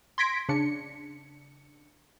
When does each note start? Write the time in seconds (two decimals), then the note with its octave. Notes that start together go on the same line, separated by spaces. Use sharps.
0.18 C6 G#6 A#6 B6 D7
0.49 C#3 D4 C#7